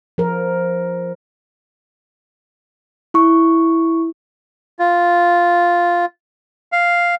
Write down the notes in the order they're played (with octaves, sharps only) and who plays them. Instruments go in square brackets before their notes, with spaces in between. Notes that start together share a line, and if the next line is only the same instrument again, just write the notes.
[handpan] F3 A#4
[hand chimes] E4 C#6
[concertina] F4
F5